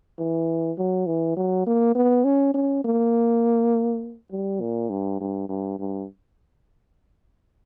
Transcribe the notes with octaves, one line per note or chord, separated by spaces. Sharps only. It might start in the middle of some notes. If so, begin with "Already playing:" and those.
E3
F#3
E3
F#3
A#3
B3
C#4
C#4
A#3
G3
A#2
G2
G2
G2
G2